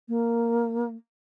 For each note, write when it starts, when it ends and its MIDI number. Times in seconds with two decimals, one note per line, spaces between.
0.08 0.94 58